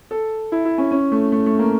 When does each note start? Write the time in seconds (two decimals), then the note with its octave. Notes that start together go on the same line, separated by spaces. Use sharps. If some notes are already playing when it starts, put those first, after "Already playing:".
0.11 A4
0.52 E4
0.65 E4
0.78 C#4
0.91 C#4
1.12 A3
1.32 A3
1.46 A3
1.59 A#3